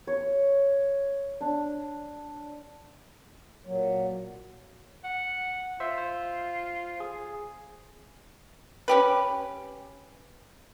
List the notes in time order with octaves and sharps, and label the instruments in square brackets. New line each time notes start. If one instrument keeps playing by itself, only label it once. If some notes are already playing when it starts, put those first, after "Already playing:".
[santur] C#5
D4
[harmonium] A#2 F#3
[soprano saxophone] F#5
[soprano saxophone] F4 [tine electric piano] C5 E5
[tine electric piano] C5
G#4
[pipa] C#4 G4 B4